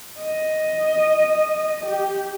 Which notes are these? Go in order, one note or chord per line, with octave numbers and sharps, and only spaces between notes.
D#5
G4